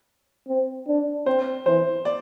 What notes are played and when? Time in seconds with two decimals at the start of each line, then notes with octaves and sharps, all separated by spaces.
0.48 C4
0.87 D4
1.26 C4 C5
1.66 E3 C5
2.05 D5